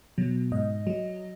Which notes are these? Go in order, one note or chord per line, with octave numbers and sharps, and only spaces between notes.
B2 F#3
G#2 D#5
F#3